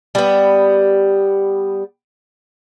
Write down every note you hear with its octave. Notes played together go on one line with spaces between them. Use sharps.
G3 B3